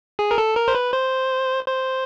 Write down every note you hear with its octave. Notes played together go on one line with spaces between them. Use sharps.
G#4
A#4
A4
A#4
C5
B4
C5
C5